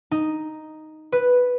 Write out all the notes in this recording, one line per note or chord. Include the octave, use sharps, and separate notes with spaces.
D#4
B4